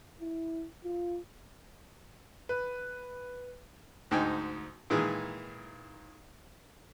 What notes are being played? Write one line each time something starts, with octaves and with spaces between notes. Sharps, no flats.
E4
F4
B4
D2 G#2 D#4 G5 G#5
A#2 D#3 E3 G#3 G#4